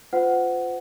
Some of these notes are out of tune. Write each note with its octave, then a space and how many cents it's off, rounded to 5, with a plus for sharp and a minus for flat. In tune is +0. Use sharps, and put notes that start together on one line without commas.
F4 +5 C5 -35 F#5 +5